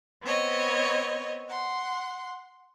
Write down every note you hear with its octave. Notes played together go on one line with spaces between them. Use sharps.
B3 C4 C#5 D#5
F#5 C6